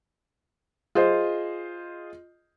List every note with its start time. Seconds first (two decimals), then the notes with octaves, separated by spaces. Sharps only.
0.95 F4 G#4 C5 D#5